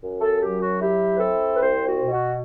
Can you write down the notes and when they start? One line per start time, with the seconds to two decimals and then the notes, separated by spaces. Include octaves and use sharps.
0.02 F#2
0.21 A4
0.41 F#3 G4
0.61 F#4
0.80 E4 G4
1.15 B4
1.20 C4 A4
1.55 B4
1.60 C2 C5
1.86 F#4
2.00 B2
2.12 F#4